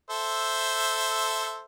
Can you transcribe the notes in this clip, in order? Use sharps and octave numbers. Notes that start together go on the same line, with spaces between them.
A4 C5 E5